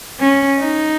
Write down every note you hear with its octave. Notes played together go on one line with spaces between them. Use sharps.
C#4
D#4